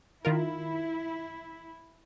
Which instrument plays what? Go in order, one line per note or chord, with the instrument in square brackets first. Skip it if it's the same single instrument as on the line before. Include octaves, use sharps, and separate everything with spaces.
[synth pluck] D#3 F4 A#4 [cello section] E4